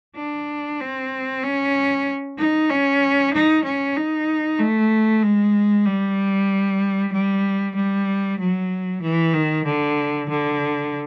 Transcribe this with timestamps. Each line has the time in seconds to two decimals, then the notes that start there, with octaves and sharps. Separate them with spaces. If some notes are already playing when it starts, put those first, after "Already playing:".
0.16 D4
0.80 C4
1.43 C#4
2.38 D#4
2.70 C#4
3.34 D#4
3.64 C#4
3.96 D#4
4.59 A3
5.23 G#3
5.86 G3
7.12 G3
7.75 G3
8.39 F#3
9.02 E3
9.34 D#3
9.66 D3
10.29 D3